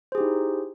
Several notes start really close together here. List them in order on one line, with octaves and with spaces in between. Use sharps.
C5 G#4 G4 D#4 E4